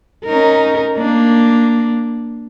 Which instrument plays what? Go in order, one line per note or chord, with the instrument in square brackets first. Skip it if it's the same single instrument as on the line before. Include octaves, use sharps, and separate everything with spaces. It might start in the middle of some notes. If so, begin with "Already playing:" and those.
[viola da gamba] C#4 D#4 A#4
A#3 D4